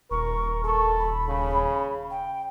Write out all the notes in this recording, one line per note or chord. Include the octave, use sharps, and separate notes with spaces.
D#1 A#4 C#6
A4 C#6
B5
C#3
G5